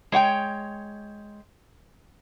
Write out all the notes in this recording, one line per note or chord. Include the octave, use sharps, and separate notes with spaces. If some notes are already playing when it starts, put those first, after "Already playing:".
G#3 C#5 F#5 G5